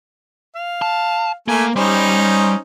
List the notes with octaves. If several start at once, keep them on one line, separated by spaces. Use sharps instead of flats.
F5
A5
A3 A#3 G#5
G3 C#4 D#4 C5